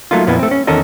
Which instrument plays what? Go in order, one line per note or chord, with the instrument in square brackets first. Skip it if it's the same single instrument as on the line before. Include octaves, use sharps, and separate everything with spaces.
[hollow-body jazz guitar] F#3 A3 A#3 D#4 F4
F2 A#2 A#3 B3 E4
A3 C4
C#4
E2 D#3 C#4 A4 A#4 D#5